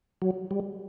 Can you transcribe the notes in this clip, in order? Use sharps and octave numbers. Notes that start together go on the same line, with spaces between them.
F#3
G3